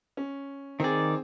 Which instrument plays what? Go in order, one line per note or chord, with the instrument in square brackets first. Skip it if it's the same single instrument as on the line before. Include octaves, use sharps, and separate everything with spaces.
[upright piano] C#4
[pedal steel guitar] D#3 D5 [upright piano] C4 G#4